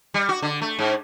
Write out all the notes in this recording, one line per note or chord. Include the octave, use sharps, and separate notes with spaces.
G3
F#4
D3
A3
G#2